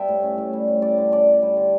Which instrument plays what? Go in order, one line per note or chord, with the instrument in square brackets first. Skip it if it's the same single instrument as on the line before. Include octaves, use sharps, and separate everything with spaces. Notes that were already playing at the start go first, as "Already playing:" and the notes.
Already playing: [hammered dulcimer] G3 B3 E5 G5 A5
A2
C#4
A2
G3
A2
G3 D5
D3
C#4 D5
D3
G3
D3